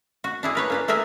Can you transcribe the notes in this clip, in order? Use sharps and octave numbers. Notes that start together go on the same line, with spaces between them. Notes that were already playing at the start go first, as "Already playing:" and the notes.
F#4
D4 E4 G#4
A#4 B4 C#5
A#3 D4 B4
A3 G#4 A#4 E5 G#5